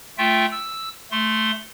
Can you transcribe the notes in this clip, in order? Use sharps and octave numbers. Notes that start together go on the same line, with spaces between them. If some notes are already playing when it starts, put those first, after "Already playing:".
A3 F4 E5 G5
E6
A3 C6